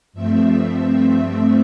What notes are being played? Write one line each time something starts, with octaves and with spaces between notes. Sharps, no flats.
G2 F3 A3 C4 E5